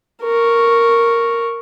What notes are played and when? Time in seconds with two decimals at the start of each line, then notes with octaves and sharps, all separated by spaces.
0.23 A#4 C#6